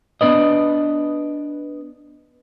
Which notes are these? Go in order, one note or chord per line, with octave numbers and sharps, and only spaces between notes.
B3 D4 B4 D#5